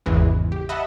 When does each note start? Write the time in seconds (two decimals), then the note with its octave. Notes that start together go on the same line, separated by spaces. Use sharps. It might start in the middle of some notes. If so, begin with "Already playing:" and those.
0.06 G#1 E2 C#3 E3 G#3
0.52 G4
0.69 D#5 E5 F#5 A5 B5